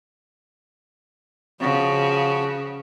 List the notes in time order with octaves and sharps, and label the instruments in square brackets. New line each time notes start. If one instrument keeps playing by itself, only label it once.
[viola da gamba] C#3 [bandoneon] F3 F#4